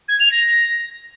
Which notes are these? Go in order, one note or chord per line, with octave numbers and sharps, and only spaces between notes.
G#6
F7
A#6